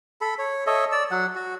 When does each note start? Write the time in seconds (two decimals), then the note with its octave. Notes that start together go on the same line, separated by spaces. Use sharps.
0.21 A4 B5
0.39 C#5
0.67 A4 C#5 D#5 E5
0.92 D5 E6
1.11 F#3 F#5
1.35 F#4